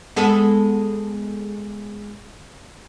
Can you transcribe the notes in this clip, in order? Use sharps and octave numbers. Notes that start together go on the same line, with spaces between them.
G#3 B3 A4